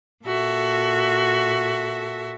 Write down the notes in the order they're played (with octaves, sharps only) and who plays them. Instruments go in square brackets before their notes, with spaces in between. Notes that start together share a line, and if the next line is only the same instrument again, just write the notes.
[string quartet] A#2 F#4 A4 E5